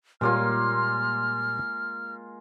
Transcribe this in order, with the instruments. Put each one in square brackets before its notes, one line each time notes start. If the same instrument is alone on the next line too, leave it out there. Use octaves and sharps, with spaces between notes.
[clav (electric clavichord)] A#2 G3 C#5 [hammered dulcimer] G#3 A#3 F4 [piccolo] F6